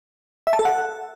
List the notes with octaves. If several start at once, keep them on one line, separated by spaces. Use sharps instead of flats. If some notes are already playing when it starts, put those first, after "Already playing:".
E5
A5
A4
F#5